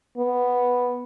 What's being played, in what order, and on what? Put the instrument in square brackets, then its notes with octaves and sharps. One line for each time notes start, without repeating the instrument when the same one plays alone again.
[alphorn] B3